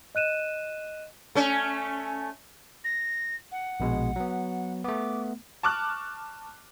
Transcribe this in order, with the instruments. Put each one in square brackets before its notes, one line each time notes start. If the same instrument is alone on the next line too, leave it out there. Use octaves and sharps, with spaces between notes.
[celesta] D#5 F#6 D#7 E7
[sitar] A3 C#4
[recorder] A#6
F#5
[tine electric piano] A#1 B2 G#3
F#3 B3
[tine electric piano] A3 B3 [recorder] D6
[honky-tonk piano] A5 C#6 D6 F6 F#6